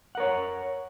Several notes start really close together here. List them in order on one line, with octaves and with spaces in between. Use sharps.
F#5 A#4 C#5